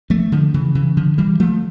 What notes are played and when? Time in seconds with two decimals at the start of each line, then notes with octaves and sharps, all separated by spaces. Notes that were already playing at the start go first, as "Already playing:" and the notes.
0.10 F3 A3
0.32 D3 F3
0.54 C#3 E3
0.75 C#3 E3
0.97 D3 F3
1.18 E3 G3
1.40 F3 A3